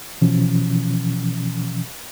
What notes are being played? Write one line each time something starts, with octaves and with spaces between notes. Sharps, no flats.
B2 E3 F3 C#4